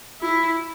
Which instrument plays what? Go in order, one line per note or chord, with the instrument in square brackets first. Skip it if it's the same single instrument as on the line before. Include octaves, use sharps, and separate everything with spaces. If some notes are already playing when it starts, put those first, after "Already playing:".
[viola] E4